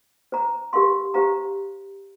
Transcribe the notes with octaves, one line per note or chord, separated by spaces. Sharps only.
C5 A#5
G4 A#4 F5 C6
G4 C5 F5 A#5